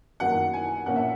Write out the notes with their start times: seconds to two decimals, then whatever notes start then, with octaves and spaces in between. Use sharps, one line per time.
0.20 F#2 D#3 F#3 A#3 F#5
0.53 G#5
0.86 A#1 A#2 A#3 C#4 F#5
0.96 E5